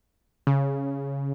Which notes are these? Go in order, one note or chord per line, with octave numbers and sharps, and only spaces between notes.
C#3